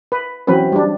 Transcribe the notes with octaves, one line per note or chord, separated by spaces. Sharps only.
B4
E3 F#3 C4 C#4 B4
G3 D4